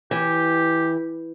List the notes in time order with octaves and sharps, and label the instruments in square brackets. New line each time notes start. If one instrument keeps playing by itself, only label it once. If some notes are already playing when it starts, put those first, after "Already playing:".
[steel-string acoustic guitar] E3 [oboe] G4